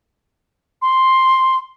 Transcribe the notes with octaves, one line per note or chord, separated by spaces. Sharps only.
C6